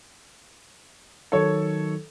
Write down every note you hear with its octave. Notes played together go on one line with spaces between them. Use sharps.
D#3 F#3 D#4 A4 C#5